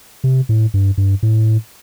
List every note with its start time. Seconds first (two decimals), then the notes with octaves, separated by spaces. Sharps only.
0.24 C3
0.49 A2
0.74 G2
0.98 G2
1.23 A2